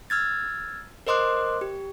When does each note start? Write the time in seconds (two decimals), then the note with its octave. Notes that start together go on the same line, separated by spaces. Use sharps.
0.10 E6 F6 G#6 A6
1.07 A#4 C5 D#5 C6 D6 F#6
1.61 G4